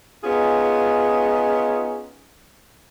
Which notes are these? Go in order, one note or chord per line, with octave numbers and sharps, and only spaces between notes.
B3 C#4 D#4 F4 G#4